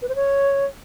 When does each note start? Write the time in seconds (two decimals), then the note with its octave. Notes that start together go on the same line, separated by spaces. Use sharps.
0.02 B4
0.09 C5
0.15 C#5